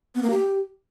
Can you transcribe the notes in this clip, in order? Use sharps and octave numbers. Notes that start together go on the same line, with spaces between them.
B3
A#3
G4